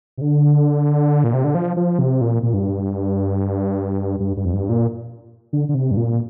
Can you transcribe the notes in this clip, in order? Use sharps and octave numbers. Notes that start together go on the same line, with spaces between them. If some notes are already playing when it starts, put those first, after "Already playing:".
C3
D3
A#2
C3
D3
F3
F3
C3
A#2
A#2
G2
G2
G2
F2
G2
A#2
D3
D3
C3
G2
A#2